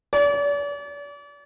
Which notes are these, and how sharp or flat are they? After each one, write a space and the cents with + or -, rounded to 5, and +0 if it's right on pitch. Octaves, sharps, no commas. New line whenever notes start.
D5 -40